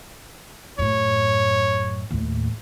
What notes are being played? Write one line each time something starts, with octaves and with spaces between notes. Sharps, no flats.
F#2 A2 C#5
D#2 A2